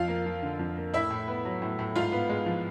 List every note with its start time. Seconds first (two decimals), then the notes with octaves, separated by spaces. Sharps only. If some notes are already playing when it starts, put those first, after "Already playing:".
Already playing: F2 F4 F5
0.08 A#3
0.26 F3
0.43 D3
0.59 F2
0.77 A#3
0.94 A2 E4 E5
1.10 A2
1.28 B3
1.45 F#3
1.62 A2
1.79 A2
1.96 G#2 F4 F5
2.12 B3
2.29 G#3
2.46 F3